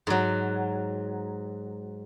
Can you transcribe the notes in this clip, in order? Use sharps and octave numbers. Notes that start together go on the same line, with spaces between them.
G#2 F#3